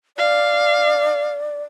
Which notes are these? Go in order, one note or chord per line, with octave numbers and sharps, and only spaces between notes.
D5 F5